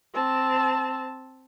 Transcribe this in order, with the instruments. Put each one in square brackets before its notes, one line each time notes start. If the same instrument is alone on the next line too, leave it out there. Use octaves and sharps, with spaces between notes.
[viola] C4 A5